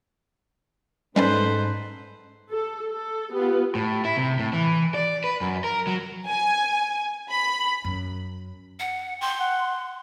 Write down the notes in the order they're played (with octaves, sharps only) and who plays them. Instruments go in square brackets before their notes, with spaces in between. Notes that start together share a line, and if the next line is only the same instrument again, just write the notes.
[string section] G#2 [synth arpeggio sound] G3 C#4 D5 [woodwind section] D#4 A4 B4 [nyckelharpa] C5
[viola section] A4
A4
[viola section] B3 F4 [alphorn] G4
[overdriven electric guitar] A2
E4
C3
A2
E3
D5
B4
F#2
A#4
F#3
[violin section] G#5
B5
[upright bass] F#2
[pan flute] F#5
[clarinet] G5 [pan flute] C6
[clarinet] F#5